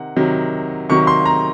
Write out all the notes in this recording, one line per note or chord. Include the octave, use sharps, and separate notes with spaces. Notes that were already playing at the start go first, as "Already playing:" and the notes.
Already playing: C3 D#3 F#5
C3 D#3 F#3
C3 D#3 F#3 C#6
C6
A#5